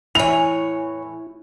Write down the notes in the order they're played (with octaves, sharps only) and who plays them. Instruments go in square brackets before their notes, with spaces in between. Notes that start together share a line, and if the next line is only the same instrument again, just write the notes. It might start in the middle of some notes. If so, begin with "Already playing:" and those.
[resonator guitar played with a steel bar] E2 A2 G#5 [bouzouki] E3 C#5 [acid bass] E4 [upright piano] F7